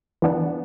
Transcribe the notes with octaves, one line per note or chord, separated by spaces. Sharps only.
E3 B3 D4